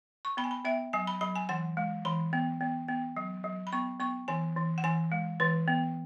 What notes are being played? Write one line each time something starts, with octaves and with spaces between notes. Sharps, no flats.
C#6
B3 B5
G#5
B5
B3 E5
F#3 G#5
B5
F#3 B5
G#5
E3 F#5
G#3
E3 B5
B3
B3
B3
F#3
F#3
B5
B3 C#6
B3 C#6
E3 G#5
E3
F#5
E3 G#5
G#3
E3 B4
B3